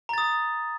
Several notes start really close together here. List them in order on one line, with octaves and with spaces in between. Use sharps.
A#5 A6 D#6